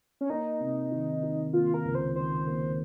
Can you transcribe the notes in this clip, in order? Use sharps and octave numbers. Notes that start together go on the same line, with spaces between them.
C#4
A#3 D#4
C3
D#3
D#3
A#3 F4
A#4
C#2
C5
D#3 C5
A#3